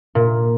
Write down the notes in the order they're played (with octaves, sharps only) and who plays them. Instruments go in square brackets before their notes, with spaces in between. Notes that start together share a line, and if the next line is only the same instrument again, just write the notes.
[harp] A#2